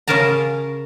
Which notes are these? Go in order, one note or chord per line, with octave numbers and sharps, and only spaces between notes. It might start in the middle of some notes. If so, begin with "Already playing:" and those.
C#3 C#4 G#4 A#4 A5 A#5